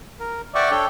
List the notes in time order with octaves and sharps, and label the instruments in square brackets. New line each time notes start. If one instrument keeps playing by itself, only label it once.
[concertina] A#4
[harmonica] D5 E5 [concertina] F#5 G5 C#6
[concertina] D4 A4 C#5 [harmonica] G5